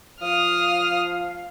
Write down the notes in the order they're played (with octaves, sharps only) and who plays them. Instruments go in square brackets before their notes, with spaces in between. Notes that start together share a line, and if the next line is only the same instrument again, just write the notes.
[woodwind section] F3 F5 [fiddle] D#6 F6